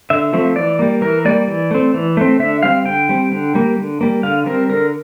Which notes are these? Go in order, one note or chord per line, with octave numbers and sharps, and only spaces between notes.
D3 E5
F3 A3 C4
E3 D5
G3 A#3
E3 A#4
G3 A#3 D5
E3
A3 C4
E3
A3 C4
D3 E5
G3 C4 F5
D3 G5
G3 C4
D3
G3 A#3
D3
G3 A#3
D3 F5
G3 C4 A#4
D3 A#4